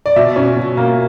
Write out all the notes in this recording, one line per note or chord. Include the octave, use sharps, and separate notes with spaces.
D5
B2 E5
C#4
B2
A#3